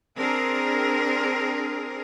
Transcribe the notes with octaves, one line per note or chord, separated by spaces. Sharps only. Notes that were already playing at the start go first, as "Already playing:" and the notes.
C4 D4 G#4 A#4